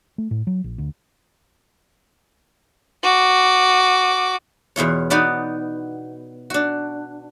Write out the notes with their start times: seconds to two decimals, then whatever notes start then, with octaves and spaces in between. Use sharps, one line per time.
0.18 A3
0.31 A2
0.47 F#3
0.64 A#1
0.78 D2
3.03 F#4 D6
4.76 E2 B2 F4 C#5
5.10 B3 D#4 F#4 B4 D5
6.50 D4 F#4